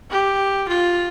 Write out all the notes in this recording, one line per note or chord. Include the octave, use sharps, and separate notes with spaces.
G4
F4